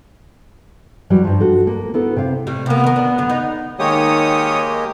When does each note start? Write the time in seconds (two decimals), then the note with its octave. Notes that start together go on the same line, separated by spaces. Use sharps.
1.10 E3 F#3 G3
1.24 G2 F3
1.40 F#4 A4
1.67 A#3
1.94 B3 E4 A4
2.16 C3 F5
2.47 A2 C3 G3
2.66 C3 A#3 B3
2.84 D#3 A#4
2.96 D4
3.18 F#2 D3
3.30 D#4
3.79 D#3 G#3 A#3 G4 C#5 D#6